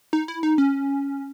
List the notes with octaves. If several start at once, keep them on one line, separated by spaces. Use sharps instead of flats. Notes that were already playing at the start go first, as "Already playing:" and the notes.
D#4
E4
D#4
C#4